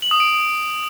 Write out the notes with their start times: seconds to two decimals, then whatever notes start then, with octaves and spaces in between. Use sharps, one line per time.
0.02 F#7
0.11 D#6
0.20 D7